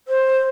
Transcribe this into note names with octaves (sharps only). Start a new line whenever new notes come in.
C5